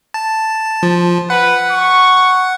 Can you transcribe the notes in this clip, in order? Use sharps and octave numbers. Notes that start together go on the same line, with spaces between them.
A5
F3
B4 F#5
C#6